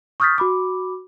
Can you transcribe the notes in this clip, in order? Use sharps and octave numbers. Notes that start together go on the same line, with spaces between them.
C#6 D#6 F6 G6 A6 B6
F#4 B5 D6